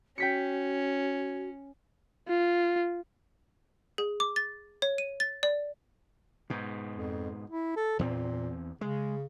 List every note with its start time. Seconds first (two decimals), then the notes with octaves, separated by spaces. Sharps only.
0.18 C#4 F#4 G5 B6 C#7
2.28 F4
3.98 G#4
4.20 D6
4.36 A6
4.82 C#5
4.98 D#7
5.20 A6
5.43 D5
6.50 G#2 B2
6.96 F2
7.50 E4
7.76 A4
7.99 E2 A#2 A3 C4
8.81 C#3 G#3